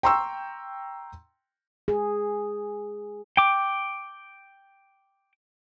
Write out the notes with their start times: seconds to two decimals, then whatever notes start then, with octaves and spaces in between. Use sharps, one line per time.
0.03 G5 A#5 C6 C#6 E6
1.88 G#4
3.37 G5 D6